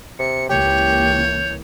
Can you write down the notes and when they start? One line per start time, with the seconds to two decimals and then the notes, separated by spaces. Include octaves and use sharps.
0.19 C3 C#7
0.50 C#2 E3 A#3 G4 C#5 G6